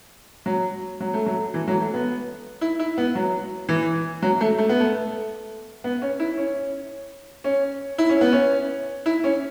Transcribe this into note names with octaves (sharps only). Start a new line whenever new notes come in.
F#3
F#3
A3
F#3
E3
F#3
A3
B3
E4
E4
B3
F#3
E3
F#3
A3
A3
B3
A3
B3
C#4
E4
C#4
C#4
E4
C#4
B3
C#4
E4
C#4